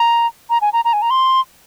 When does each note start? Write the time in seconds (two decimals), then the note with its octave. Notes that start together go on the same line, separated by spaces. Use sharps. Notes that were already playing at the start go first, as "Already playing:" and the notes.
Already playing: A#5
0.50 A#5
0.61 G#5
0.73 A#5
0.85 A#5
0.93 G#5
1.02 A#5
1.10 C6